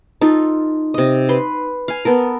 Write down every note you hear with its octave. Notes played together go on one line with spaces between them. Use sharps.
D#4 F4 A4
C3 D#5
B4 C6
F5 G#5
B3 A4 A#4